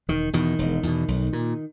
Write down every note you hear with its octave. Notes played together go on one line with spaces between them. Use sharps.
E1 D#3
E2 B2 D#3
E1
E2 B2
B1
A#2